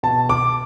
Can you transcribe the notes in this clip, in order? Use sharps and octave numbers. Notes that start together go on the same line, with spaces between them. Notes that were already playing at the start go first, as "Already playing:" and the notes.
B2 A5
D6